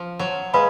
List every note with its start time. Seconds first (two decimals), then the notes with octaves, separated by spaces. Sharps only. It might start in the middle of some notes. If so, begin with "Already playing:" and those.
Already playing: F3
0.19 F#3
0.53 G#3 B4 F5 B5